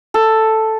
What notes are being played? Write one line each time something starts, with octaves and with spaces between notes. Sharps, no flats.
A4